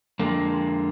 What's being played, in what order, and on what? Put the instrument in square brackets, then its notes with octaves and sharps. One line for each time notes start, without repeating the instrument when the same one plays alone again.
[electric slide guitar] F2 D3 G#3 A#3